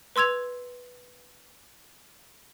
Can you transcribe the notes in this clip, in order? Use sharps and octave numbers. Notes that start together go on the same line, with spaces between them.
B4 C6 E6 G#6 F7